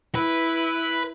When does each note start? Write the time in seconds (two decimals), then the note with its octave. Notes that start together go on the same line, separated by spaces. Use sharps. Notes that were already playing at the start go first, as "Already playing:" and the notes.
0.15 E4 B4